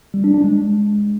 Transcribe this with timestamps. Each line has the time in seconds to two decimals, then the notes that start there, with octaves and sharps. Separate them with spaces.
0.14 G3
0.24 D4
0.34 D4
0.44 G#3